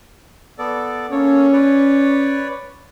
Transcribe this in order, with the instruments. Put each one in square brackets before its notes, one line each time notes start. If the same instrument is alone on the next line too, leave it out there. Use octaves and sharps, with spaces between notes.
[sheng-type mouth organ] B3 A4 D5
[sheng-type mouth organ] A#3 A4 C#5 [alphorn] C#4
[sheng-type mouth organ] B4 C#5 D5